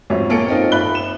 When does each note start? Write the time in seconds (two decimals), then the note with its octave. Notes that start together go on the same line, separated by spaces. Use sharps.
0.10 F2 G#2 F#3 C#5 E5
0.29 B1 A#3 A4 C#5 C#7 D7
0.48 C4 C#4 D#4 F4 A4
0.72 D#1 E5 B5 F#6 G7
0.95 E7